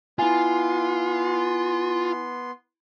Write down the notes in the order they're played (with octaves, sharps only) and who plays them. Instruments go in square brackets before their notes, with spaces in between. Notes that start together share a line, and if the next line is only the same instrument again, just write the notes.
[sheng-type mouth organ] B3 C6 [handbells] E4 G#5 [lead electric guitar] F4